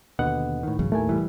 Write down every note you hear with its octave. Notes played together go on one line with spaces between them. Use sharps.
D#2 B2 D3 B4 D#5 F#5
A2 D#3
A1 F#2 C#3
D#2 A2 A3 A#4 G#5
F1 E3 G3